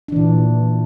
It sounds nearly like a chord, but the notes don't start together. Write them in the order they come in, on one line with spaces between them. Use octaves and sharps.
D4 E3 A#2